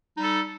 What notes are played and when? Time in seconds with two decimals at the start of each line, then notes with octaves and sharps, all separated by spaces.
0.14 D#4
0.19 G3
0.23 A4